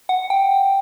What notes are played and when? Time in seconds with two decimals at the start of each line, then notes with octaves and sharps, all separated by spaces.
0.09 F#5
0.30 G5